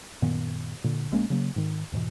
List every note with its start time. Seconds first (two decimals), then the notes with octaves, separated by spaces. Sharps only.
0.22 F#2 A#2 D#3 B3
0.84 A#2 D3
1.12 A#1 G#3 A#3 C#4
1.30 C#3 F#3 A#3
1.56 G#2 D#3
1.92 E2 G#2 B2 E3